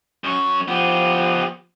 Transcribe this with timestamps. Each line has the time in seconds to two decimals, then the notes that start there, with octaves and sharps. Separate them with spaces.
0.24 F#2 C#5
0.68 F3 B3 G4